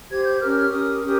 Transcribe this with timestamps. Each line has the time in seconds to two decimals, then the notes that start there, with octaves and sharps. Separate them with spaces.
0.10 G4 C5 G#6
0.25 G6
0.40 C#4 G4 A#4 F6
0.56 F6
0.71 C#4 G4 A#4 D#6
1.03 C#4 G4 A#4